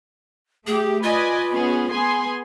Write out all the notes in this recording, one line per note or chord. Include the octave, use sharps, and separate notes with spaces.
A3 G4 G#4
F4 B4 D5 D#5 G#5
B3 C#4 G#4
B3 G#4 G#5 C6